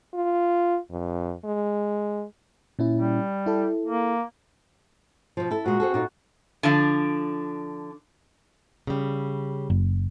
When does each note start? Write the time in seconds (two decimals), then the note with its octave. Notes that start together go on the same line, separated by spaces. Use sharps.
0.14 F4
0.91 F2
1.45 G#3
2.79 A#2 C#4 E4
2.96 G3
3.46 E4 A4
3.86 A#3
5.37 B2 F3
5.51 E4 A4
5.66 A#2 G#3 F#4
5.80 C4 G#4 A4
5.94 A#2 D#4
6.63 D3 F3 D4
8.87 C#3 G3
9.70 F#1